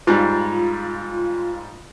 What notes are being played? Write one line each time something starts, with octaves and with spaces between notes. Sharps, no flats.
G#2 G3 F4